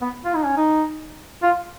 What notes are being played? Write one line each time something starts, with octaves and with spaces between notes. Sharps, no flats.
B3
F4
D#4
C#4
D#4
F4